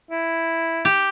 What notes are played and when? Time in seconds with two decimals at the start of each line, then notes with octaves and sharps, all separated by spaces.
0.11 E4
0.85 G4